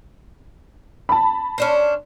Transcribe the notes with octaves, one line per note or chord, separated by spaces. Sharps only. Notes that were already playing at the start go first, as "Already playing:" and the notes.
A5 B5
C#4 D4 C5